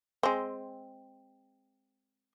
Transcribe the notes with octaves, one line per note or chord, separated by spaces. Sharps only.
G#3 C4